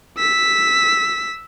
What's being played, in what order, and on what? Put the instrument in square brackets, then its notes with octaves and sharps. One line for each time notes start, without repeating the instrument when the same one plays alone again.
[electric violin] E6 B6